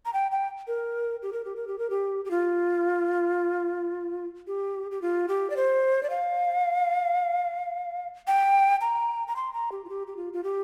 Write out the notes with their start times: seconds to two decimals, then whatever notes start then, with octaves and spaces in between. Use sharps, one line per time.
0.06 A#5
0.13 G5
0.32 G5
0.67 A#4
1.22 G4
1.33 A#4
1.45 G4
1.56 A#4
1.68 G4
1.79 A#4
1.90 G4
2.25 G4
2.31 F4
4.47 G4
4.91 G4
5.02 F4
5.28 G4
5.50 D5
5.56 C5
6.03 D5
6.10 F5
8.27 G5
8.81 A#5
9.28 A#5
9.36 C6
9.53 A#5
9.72 G4
9.85 F4
9.89 G4
10.07 G4
10.17 F4
10.33 F4
10.44 G4